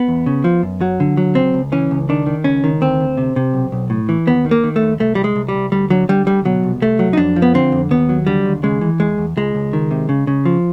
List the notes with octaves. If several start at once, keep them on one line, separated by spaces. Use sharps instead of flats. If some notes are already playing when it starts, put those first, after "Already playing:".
Already playing: B3
E2
C#3
F3
F#2
F#3
D3
F#3
C#2 C4
C#2
E3 C#4
C#2
D#3 D4
D#3
C#2 C#4
D#3
D2 C4
D2
C3
C3
B1
B1
A2
E3
D#2 B3
D#3
A#3
D#3
A3
D#2
C2 A3
C2 G3
G#3
C2
G3
C2
D2 G3
D3 F#3
D3 G3
D2 G3
B2 F#3
C2
C2 A3
F#3
D#4
F2 D4
F3
B3
D3 C4
F2
D#2 B3
F#3
D3 G3
D#2
C#3 G#3
E3
E2 G#3
E2
C#2 G#3
C#2
D#3
C3
C#3
C#3
F3